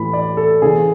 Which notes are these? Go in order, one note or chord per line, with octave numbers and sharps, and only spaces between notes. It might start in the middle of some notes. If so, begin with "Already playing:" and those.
Already playing: A2 E3 B5
D5
A4
C#3 E3 G#4